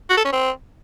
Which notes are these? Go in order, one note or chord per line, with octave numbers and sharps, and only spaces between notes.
F#4
A4
C#4
C4